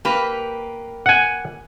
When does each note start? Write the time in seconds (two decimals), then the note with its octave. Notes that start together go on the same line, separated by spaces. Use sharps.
0.05 A#3 G4 B4
1.06 F#5 G#5